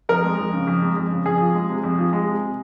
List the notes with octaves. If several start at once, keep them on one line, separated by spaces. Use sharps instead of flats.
F2 A#4
G#3
F2
C#3
F2
G#3
F2
C#3
F2 G#4
F3
G#3
C3
F2
F3
G#3
C3